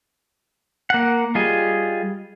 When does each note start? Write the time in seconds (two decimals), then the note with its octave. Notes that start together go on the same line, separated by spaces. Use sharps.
0.90 A#3 F#5
1.35 G3 F4 G#4 D#5